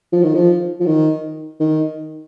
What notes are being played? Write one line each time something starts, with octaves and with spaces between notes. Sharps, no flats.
F3
D#3
F3
F3
D#3
D#3